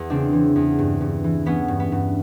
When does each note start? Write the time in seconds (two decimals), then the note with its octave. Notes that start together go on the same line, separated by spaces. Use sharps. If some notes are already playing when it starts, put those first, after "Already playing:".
Already playing: E2
0.10 C#3 C4 D4
0.33 E3
0.56 E2
0.78 G2
1.01 G2
1.24 E3
1.46 E3 B3 C#4
1.68 G2
1.80 B3
1.92 G2